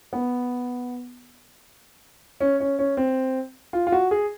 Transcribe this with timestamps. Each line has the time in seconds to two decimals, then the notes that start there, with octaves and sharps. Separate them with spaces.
0.13 B3
2.41 C#4
2.60 C#4
2.79 C#4
2.97 C4
3.73 F4
3.87 F4
3.92 F#4
4.11 G#4